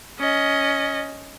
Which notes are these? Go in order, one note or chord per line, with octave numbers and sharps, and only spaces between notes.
C#4 D#5